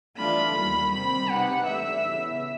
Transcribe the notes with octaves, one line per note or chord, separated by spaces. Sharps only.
E3 A3 D4 F4 A4 B5
D#2 D#3 G3 A#3
C3 D#3 G3 C4 B5
G#3 C4 D#4 G4 B4 F#5
G2 E3 A3 E5
E2 C#3 E3